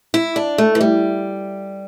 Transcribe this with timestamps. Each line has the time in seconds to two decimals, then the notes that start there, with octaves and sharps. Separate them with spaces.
0.14 E4
0.36 D4
0.58 A3
0.75 E3
0.81 G3